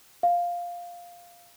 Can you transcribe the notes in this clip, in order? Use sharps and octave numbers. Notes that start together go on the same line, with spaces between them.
F5